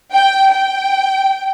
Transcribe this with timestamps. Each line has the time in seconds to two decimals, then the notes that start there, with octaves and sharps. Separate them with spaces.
0.14 G5
0.51 G5